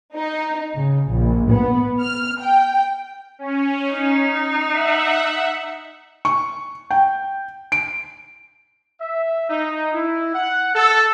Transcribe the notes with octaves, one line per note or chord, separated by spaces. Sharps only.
D#4
C#3
A#1
B3
F6
G5
C#4
D#4
E5 F#5
C#6
G5
D7
E5
D#4
E4
F#5
A4